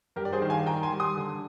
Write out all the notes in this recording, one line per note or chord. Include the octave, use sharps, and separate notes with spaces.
G2 G4 A#4
D5
G#4 C5
D#3 G5
F5 G#5
D#3 G5 A#5
G#5 C6
G3
C6 D#6
D3